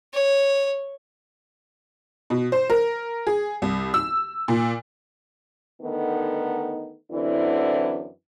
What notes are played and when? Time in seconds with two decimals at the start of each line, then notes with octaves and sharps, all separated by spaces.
0.14 C#5
2.30 B2
2.52 C5
2.70 A#4
3.27 G#4
3.62 C2
3.94 E6
4.48 A#2
5.82 D3 D#3 A3 B3 D#4
7.11 F#2 D3 E3 C4 D4 E4